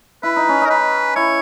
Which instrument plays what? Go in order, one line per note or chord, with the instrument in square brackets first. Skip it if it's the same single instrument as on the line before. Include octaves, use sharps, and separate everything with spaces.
[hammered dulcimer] E4 [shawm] B4
[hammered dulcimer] D#4
C#4
[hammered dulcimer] D#4 [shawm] A#4
[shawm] B4
[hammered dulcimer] E4 [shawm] C#5